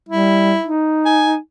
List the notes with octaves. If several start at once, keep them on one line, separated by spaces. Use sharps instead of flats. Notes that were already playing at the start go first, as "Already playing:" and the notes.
G3 E4
D#4
G#5